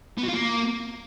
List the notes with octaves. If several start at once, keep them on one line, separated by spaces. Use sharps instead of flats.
B3
F#4
F4
A#3